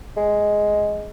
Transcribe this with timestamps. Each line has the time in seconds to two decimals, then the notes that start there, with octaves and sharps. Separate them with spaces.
0.17 G#3